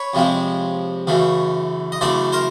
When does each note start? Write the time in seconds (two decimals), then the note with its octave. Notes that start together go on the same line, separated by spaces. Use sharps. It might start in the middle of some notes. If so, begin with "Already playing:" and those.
Already playing: B4 C#5
0.14 F2 C3 F3 G#3
1.07 F#2 C#3 E3 A3
1.92 D#5
2.01 F#2 C#3 E3 A3 C5 D5
2.32 A#4 C5